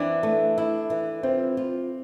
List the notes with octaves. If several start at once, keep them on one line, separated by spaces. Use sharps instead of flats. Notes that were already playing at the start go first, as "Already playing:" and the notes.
Already playing: E3 C4 D4
A3
E4
E3
C4 F4
F4